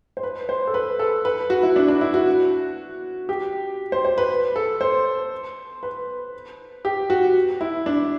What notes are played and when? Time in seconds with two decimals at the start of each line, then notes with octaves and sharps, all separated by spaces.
0.17 C5
0.23 B4
0.49 C5
0.67 A4
0.74 B4
0.99 A4
1.25 B4
1.50 F#4
1.63 E4
1.76 D4
1.88 D4
2.01 E4
2.14 F#4
3.29 G4
3.92 C5
4.05 C5
4.18 B4
4.56 A4
4.81 C5
5.83 B4
6.85 G4
7.10 F#4
7.61 E4
7.86 D4